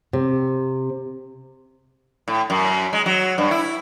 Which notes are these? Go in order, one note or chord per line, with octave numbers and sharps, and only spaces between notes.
C3
A2
F#2
G#3
F#3
G2
E4